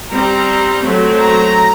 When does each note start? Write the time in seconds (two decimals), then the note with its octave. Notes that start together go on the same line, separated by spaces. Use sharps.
0.10 G3 C4 A#5
0.83 F#3 A3 C4
1.20 A#5